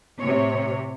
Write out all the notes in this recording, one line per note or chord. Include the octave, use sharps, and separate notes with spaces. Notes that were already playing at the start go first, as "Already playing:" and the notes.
A2 C3 C#5